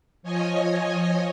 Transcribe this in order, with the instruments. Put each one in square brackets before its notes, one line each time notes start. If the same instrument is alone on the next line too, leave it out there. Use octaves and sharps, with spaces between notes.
[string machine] F3 C#5 D#5 G#5